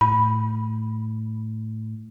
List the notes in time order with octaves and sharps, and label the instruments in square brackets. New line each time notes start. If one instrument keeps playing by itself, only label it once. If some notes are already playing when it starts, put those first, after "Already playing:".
[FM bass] A2 [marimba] B5